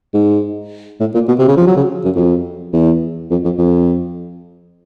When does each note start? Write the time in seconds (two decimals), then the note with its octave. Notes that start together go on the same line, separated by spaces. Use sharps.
0.14 G#2
1.00 A2
1.14 A#2
1.28 B2
1.39 C3
1.48 C#3
1.57 F3
1.67 F#3
1.77 C#3
2.05 F#2
2.16 F2
2.73 E2
3.31 F2
3.45 F2
3.59 F2